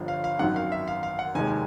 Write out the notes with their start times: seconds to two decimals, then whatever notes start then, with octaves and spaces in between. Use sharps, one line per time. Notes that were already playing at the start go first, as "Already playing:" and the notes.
Already playing: G1 G2 D3 F3
0.08 F5
0.24 F5
0.39 G#1 F#2 D#3 F#5
0.56 F5
0.72 E5
0.88 F5
1.03 F5
1.19 F#5
1.35 F1 D#2 D#3 G#3 G#5